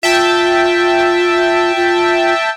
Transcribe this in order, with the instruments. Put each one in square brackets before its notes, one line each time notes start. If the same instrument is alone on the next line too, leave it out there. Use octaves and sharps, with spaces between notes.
[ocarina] F4 [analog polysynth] E5 G5 A5
[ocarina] F4